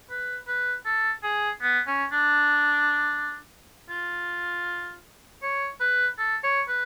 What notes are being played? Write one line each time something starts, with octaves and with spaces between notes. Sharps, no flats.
B4
B4
A4
G#4
B3
C#4
D4
F4
C#5
B4
A4
C#5
B4